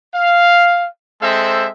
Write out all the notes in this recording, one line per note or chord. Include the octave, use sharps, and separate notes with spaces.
F5
G#3 C4 A4 C5 E5